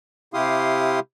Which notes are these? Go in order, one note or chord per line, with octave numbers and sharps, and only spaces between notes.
C3 E4 G4 F5 C6 D#6